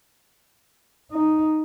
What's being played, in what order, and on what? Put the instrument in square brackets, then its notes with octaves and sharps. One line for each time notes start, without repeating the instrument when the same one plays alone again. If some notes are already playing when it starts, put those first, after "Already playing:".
[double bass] D#4